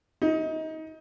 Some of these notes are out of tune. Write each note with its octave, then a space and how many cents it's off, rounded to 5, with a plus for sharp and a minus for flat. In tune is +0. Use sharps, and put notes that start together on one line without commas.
D#4 +30